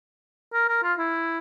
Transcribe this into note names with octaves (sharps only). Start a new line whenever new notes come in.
A#4
A#4
F4
E4